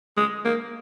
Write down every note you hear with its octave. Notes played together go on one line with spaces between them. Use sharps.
G#3
A#3